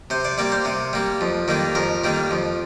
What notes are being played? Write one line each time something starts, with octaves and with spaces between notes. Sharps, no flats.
C3 C5
D5
G3 A#3 D5
C5
C3
G3 A#3
F2
D#3 G3 A#3
F2 A#4
D#3 G3 A#3
F2